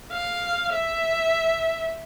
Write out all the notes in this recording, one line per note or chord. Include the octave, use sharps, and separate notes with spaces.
F5
E5